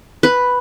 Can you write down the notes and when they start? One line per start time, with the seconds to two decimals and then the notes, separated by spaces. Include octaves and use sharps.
0.23 B4